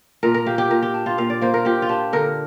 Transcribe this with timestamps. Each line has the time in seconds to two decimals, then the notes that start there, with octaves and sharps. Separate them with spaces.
0.23 A#2 A#4
0.34 A#4
0.46 A#3 G4
0.58 G4
0.70 A#2 A#4
0.83 G4
0.94 D4
1.06 F4
1.18 A#2 F5
1.30 D5
1.41 A#3 C5
1.54 A#4
1.65 A#2 G4
1.82 F4
1.89 D4 G4
2.13 D3 A#4